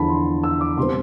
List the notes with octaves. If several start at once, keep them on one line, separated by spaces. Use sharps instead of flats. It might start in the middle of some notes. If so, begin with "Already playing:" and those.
Already playing: E2 D3 F3 A5 B5
C6
E6
D6
B2 G3 C4 C6